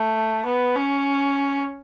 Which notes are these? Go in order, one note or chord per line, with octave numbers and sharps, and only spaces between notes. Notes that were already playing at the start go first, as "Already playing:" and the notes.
Already playing: A3
B3
C#4